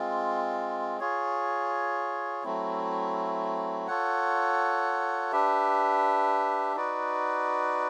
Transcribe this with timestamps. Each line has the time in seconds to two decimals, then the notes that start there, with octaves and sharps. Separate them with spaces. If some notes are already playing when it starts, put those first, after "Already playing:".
Already playing: G#3 C4 F4
1.00 F4 G#4 C#5
2.43 F#3 A3 C4 E4
3.87 F4 A4 C#5 F#5
5.32 D4 G4 B4 E5
6.75 D#4 F#4 B4 D5